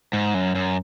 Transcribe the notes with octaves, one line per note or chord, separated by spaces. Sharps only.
G#2
F#2
F#2